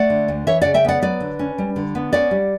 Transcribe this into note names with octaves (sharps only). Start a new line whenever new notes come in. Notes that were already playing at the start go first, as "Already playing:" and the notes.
Already playing: A3 D5 F#5
D3
D2
E3 C#5 E5
C#3 D5 F#5
E5 G5
B3 D5 F#5
F#3 B4 D5
D3
C#4
G3
D3
B3
C#4 D5 F#5
G3